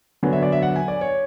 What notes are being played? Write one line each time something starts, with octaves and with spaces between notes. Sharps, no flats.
D3 F#3 B3 G#5
E5
D5
E5
F#5
G#5
D5
C#5